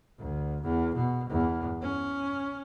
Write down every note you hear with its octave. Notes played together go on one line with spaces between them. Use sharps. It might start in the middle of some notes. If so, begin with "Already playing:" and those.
D2
E2
B2
E2
C#4